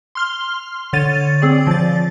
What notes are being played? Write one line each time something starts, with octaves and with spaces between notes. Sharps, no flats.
C6 F6 G7
D3 C#5 A6 D#7
C4 G#4 D5
F3 A6